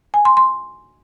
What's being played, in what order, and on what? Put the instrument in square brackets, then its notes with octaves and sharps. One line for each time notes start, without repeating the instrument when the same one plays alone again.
[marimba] G#5
C6
C6